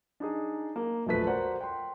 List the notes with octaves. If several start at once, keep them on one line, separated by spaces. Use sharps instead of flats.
D4 D#4 G#4
A#3
E1 A#1 F3 A3 B4 B6
F#4 A#4 C5 D5 F#5
G5 C6